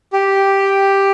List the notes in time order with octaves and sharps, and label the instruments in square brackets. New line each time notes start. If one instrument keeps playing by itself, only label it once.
[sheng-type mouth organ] G4